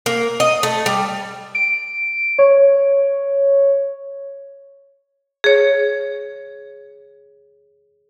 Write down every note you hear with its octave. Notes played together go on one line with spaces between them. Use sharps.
A#3
D#5
A3
G3
D7
C#5
G#4 C#5